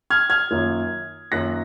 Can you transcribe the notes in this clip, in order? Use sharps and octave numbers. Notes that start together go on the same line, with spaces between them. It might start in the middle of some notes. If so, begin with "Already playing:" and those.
F6 G#6
F6 G#6
F#2 D#3 A#3 F4
F#2 D#3 A#3 F4 F#6 A#6